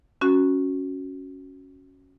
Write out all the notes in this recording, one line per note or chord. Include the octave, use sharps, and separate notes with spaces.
C#4 F#4